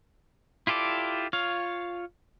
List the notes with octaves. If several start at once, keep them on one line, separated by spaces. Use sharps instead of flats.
E4 F4 G4 A4 D5
F4 C#5 F5